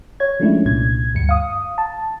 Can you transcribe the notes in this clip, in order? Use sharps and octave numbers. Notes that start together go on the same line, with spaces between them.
C#5 G#6
F3 G#3 A3 C#4 D4 E4
C2 A#2 G#6
D2 G2 C#7
F5 D#6
A5